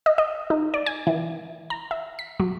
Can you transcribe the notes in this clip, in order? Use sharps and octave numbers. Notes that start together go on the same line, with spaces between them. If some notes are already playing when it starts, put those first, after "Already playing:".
D#5
D#5
D#4
D5
G#5
E3
A#5
E5
B6
F#3